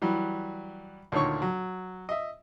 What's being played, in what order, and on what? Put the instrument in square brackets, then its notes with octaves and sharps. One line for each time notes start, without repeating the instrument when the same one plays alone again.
[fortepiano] E3 F#3 G3
D2 A#2 D#3 C#5 C#6
F#3
D#5 E5